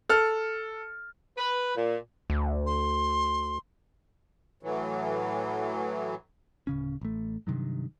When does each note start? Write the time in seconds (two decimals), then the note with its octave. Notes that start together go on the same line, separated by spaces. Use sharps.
0.09 A4 F6
1.37 B4
1.75 A#2
2.30 D2
2.66 C6
4.63 A2 E3 F#3
6.67 D1 C#3 C#4
7.01 A1 A3
7.47 G2 C3 D#3 F#3